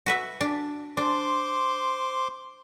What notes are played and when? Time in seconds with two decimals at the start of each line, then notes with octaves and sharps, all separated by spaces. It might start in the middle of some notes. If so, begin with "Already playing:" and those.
0.06 F#4 B4 E5
0.41 D4
0.97 D4 C5 C6 D6